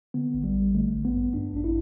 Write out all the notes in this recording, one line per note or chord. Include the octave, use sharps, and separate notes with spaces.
D3 B3
A1
G3
A1
D3 A3
A1
B3
G2
G2 D4
A1 D4
E4